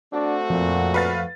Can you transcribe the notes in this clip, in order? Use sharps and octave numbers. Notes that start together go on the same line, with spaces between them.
A3 C4 D4 F#4
F2 A#2
B4 F5 A6